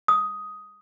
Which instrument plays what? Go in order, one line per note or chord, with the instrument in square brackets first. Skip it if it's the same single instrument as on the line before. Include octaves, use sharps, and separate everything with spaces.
[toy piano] D#6